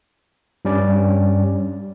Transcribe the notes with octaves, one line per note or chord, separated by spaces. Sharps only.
G2 G3 C#4 D5